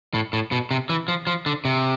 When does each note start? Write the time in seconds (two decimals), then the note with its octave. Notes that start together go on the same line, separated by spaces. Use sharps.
0.14 A2
0.33 A2
0.52 B2
0.71 C3
0.89 E3
1.08 F3
1.27 F3
1.46 D3
1.65 C3